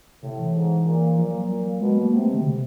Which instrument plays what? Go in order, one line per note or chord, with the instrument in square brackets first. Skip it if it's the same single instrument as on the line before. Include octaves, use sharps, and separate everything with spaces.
[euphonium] A2 [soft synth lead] C3
[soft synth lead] E3
[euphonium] G#2
A#2
[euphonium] A#2 [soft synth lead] F3
[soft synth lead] F#3
F#3
[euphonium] A#2 [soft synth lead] F#3
[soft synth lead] F#3
[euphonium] B2 [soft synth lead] G#3
[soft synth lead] A#3
[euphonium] C3 [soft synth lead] A3
[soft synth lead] G#3
D3
C3